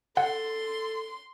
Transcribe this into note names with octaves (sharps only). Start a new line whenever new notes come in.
A4 F#5 C6